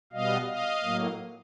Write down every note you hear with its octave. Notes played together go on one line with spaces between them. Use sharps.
B2 G3 B3 D#5 F5
D#5 F5
A2 F#3 A#3